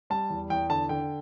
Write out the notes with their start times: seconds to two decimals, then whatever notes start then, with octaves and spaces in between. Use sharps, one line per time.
0.10 G3 A5
0.30 E2
0.50 E2 G5
0.70 D3 A5
0.89 D3 G5